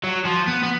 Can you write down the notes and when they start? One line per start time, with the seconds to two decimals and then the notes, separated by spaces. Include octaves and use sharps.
0.03 F#3
0.25 F3
0.47 B3
0.63 B3